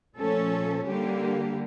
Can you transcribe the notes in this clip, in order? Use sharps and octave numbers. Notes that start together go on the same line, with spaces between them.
A#2 F3 A3 C#4 A4
D3 G3 A#3 G4